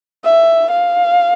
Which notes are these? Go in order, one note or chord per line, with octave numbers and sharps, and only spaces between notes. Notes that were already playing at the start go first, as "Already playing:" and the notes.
E5
F5